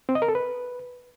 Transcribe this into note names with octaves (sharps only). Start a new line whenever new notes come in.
C4
D#5
A#4
A4
B4